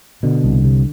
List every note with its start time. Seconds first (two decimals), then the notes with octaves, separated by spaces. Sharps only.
0.23 B2 D3
0.44 C2
0.64 C3